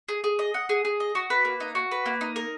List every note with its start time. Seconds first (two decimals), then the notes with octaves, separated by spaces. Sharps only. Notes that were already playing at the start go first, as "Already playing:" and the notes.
0.09 G#4
0.24 G#4
0.39 D#5
0.54 F#5
0.69 G#4
0.85 G#4
1.00 D#5
1.15 F#4
1.30 B4
1.45 A#3
1.60 D#4
1.75 F#4
1.91 B4
2.06 A#3
2.21 D#4
2.36 A#4